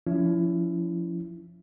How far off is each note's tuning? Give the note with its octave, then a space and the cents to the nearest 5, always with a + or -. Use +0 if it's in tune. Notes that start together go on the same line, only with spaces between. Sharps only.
F3 +0 C#4 +30 E4 +15